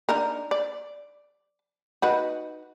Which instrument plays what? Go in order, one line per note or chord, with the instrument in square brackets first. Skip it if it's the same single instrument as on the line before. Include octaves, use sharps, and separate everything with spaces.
[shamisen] D4 D#4 A#4
D5
D#4 F#4 B4